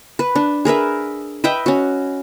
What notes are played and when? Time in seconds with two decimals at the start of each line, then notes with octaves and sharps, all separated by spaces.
0.19 B4
0.35 D4
0.65 G#4 A#4 B4 E5
1.44 B4 D#5 E5 G5
1.66 C#4 F#4